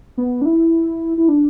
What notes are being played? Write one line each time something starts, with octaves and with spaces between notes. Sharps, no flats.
B3
D4
E4
E4
D4